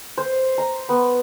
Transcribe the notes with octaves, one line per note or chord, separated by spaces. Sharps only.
C5
A#5
B3